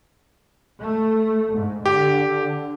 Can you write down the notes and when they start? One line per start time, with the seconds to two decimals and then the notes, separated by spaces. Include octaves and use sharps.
0.81 A3
1.56 G#2
1.86 D3 G4